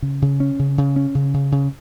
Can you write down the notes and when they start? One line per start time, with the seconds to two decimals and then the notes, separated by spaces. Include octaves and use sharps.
0.02 C#3
0.22 C#3
0.40 C#4
0.59 C#3
0.78 C#3
0.96 C#4
1.15 C#3
1.34 C#3
1.52 C#3